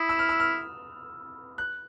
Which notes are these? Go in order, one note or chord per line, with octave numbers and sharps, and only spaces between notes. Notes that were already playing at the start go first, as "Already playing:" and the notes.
Already playing: E4 D#6
E6
F6
E6
F6
F#6